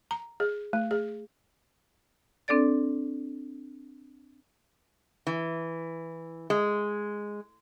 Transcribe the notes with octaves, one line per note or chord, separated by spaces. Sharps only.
A#5
G#4
A3
G#4
C4 D4 A4 D5 A6
E3
G#3